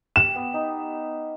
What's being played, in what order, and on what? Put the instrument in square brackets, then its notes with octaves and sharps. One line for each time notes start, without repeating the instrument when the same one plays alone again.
[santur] G4 [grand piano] E7
[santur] B3
D#4